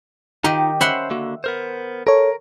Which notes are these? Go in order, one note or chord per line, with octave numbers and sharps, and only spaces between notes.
D#3 D#4 F4 G4 D#5
C#4 C5 E5 F#5 B5 C6
D3 A#3 F#4
B3 A#4 C5
A4 A#4 C#5